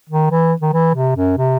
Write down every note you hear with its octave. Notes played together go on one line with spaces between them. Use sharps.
D#3
E3
D#3
E3
C3
F#2
C3